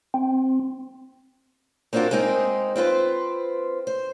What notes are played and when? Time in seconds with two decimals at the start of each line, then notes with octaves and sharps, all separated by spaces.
0.14 C4
1.93 A#3 C4 D4 D#4 F4 F#4
2.11 G#3 A#3 C4 D#4 F#4 G#4
2.76 C4 F4 B4 C5
3.87 C5